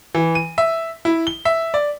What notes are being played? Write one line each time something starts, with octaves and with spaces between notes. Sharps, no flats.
E3
D#7
E5
E4
G7
E5
D5